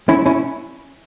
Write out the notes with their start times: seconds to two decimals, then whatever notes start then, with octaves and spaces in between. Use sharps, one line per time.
0.09 C#4 E4
0.26 C#4 E4